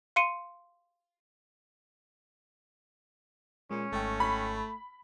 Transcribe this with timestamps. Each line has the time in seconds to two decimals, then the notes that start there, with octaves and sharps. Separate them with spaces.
0.16 F5 C6 C#7 D#7
3.71 A#2 G#3 C#4
3.92 G#1 G#2 A3 G5
4.20 B5